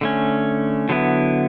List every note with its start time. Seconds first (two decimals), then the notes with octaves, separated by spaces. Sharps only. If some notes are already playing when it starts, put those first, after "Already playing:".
0.01 D3 A3 C#4
0.89 D3 F#3 B3 E4